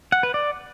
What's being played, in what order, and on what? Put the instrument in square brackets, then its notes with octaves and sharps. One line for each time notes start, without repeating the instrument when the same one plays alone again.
[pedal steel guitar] F#5
B4
D5